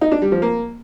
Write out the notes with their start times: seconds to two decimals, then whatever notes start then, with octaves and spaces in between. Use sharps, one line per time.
0.01 D#4
0.12 D4
0.22 G3
0.32 F3
0.42 A#3